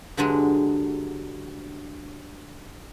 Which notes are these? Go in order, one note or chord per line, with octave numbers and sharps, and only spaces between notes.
G2 D3 F#3 G#3